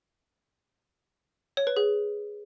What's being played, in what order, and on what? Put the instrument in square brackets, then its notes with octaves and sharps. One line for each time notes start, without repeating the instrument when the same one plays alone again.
[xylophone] C#5
B4
G#4